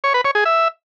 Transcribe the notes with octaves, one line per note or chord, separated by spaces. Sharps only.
C#5
B4
C#5
G#4
E5